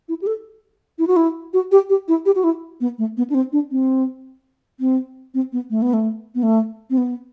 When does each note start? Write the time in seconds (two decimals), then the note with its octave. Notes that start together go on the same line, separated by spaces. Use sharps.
0.09 E4
0.22 G4
0.27 A4
0.99 E4
1.07 F#4
1.16 E4
1.53 F#4
1.72 G4
1.90 G4
2.08 E4
2.26 G4
2.36 F#4
2.44 E4
2.81 B3
2.98 A3
3.17 B3
3.30 D4
3.34 C4
3.53 D4
3.71 C4
4.80 C4
5.34 C4
5.53 B3
5.70 A3
5.82 B3
5.93 A3
6.35 B3
6.43 A3
6.90 C4
6.98 B3